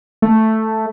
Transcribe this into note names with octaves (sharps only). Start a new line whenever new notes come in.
A3